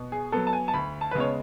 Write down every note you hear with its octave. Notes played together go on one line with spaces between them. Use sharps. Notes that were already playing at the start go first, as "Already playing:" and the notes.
Already playing: B2
G#4
F#3 B3 A4
A5
G#5
A5
D2 B5
A5
B4
C#3 G#3 B3 C#5